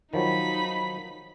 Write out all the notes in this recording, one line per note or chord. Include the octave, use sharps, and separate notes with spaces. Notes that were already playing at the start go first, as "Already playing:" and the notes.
D#3 F3 F#3 D#4 B5